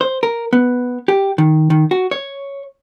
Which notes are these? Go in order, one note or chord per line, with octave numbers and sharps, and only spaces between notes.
C5
A#4
B3
G4
D#3
D#3
F#4
C#5